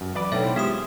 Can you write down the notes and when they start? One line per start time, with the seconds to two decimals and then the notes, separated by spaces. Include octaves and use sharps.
0.01 F#2
0.15 E3 F#3 B4 D5
0.32 B2 A3 B3 D4 D#4 C#5 E5 G5
0.44 E4 C5
0.56 G#3 B3 F4 G4 E5 D#6